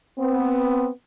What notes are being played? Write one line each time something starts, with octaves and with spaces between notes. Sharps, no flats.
B3 C4